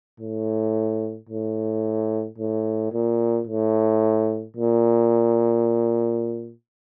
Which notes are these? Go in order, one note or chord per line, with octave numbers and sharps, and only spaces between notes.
A2
A2
A2
A#2
A2
A#2